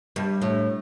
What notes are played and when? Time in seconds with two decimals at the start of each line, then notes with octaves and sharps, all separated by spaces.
0.16 G2
0.42 A2